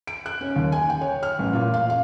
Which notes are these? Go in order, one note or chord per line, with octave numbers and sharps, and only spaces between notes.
D7
F#6
C#4
D#2
G#5
G5
C#5
F6
A1
A#2
F5
F5